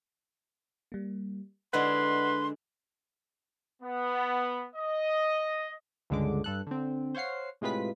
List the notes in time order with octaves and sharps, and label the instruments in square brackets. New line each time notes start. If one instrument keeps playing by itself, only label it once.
[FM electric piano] G3 A#3
[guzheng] D3 G#3 E4 [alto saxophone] B4 [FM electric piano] D5 D#5 F#5 [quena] C6
[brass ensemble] B3
D#5
[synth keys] C#2 G2 D3 G#3 D6
G2 A4 F#6
D3 C4
C5 C#5 F5 F#5 C7
A2 C3 G#3 F4 B4 B6